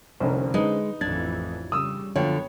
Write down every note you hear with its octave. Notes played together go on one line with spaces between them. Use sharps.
F1 C2 D3 C#4 D4 C5
G#3 D#4 B4
A1 F2 E3 D4 G#6 A6
C#3 G3 D#6 E6
F#2 D3 F3 B3 F4 C#5 G5